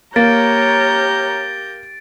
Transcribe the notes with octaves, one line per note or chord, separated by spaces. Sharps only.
A#3 G4 A#4 C#5 G6 A6 A#6 D7